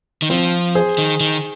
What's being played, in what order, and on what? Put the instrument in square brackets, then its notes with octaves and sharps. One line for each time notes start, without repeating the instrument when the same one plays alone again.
[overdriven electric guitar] D#3
[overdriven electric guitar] F3 [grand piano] C4 F4
[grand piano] G#4 C5
[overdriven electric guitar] D#3
D#3